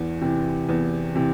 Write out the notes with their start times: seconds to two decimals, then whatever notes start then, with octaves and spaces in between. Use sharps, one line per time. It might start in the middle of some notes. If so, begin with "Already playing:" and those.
Already playing: E2
0.21 C3 E3
0.69 E2
1.15 C3 E3